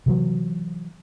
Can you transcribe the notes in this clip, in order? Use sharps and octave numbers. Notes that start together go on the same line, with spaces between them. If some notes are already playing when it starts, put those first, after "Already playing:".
C3 E3 F#3